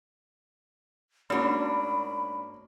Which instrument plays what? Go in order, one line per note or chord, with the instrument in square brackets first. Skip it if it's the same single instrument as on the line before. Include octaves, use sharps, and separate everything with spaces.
[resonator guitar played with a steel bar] G#2 D4 [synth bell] A3 [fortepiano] A#3 C#4 F#4 [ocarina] B5